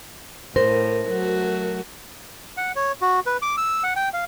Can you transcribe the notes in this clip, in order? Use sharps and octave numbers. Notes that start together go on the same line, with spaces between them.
A2 A#4 C5
F#3 A3 F#4
F#5
C#5
F#4
B4
D6
E6
F#5
G5
F5